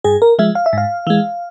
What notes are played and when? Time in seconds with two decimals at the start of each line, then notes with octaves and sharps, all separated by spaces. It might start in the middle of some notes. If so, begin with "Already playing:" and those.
0.04 G2 G#4
0.22 A#4
0.39 F3 G#3 E5
0.55 F5
0.66 E5
0.73 G#2 F5
1.07 E3 G#3